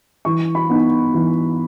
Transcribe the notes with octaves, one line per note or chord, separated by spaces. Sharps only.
E3 C#6
B5
B3 D#4
E3